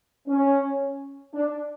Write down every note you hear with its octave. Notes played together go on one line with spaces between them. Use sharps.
C#4
D4